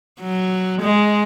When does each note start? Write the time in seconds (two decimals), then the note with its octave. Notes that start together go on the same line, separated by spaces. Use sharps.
0.20 F#3
0.82 G#3